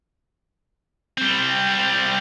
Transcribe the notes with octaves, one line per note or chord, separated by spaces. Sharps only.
G3 C4